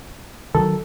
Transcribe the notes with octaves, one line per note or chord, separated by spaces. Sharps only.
D#3 E3 F#3 A4